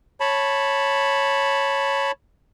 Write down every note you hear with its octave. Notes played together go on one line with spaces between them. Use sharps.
C#5 A5 B5